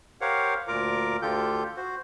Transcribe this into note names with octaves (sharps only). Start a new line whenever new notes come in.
G4 A#4 C5 C#5 F5 F#5
D2 A#2 F4 A#4 A#5 D6
D2 D3 F4 G4 A4 G6
F#4 C5